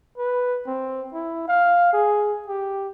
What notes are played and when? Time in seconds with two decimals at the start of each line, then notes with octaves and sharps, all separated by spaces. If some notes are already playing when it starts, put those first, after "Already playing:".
0.18 B4
0.67 C4
1.13 E4
1.48 F5
1.93 G#4
2.48 G4